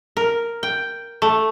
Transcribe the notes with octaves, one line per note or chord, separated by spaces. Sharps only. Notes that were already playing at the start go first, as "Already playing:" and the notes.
A#4
G5
A3